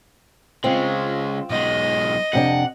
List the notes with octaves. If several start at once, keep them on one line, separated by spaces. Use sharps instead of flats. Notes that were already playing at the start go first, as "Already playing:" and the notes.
C#3 G#3 C4 F4
B1 G#3 D#5
F2 C3 D4 F#5